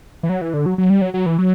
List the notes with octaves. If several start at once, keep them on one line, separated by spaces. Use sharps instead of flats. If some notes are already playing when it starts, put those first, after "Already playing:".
E3
F#3
E3
D3
F#3
F#3
G3
F#3
F#3
E3
F#3